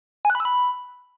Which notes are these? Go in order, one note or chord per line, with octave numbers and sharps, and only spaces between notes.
G#5
F#6
B5
E6
B5